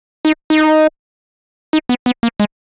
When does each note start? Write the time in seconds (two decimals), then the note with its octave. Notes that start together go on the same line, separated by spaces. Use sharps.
0.25 D#4
0.50 D#4
1.73 D#4
1.89 B3
2.06 B3
2.23 A#3
2.40 G#3